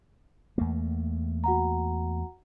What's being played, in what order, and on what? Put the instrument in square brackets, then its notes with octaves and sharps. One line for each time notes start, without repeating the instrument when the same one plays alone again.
[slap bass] E2 A3 A#3
[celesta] F#4 F#5 A#5